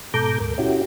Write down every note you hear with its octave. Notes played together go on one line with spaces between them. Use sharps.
G#2 B2 A4 A#5 D6 G6
D2 G#2 A#4
C#4 E4 F#4 G4